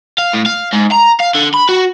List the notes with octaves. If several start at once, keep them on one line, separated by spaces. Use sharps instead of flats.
F5
A2
F5
G#2
A#5
F5
D3
B5
F#4